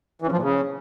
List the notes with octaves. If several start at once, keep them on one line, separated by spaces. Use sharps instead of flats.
E3
C#3
F3
A#2
C#3